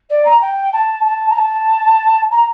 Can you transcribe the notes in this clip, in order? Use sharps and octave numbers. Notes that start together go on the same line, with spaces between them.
D5
A#5
G5
A5
A5
A#5
A5
A#5